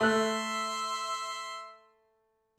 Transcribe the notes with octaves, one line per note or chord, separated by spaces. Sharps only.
A3 E5 C6 E6 F#6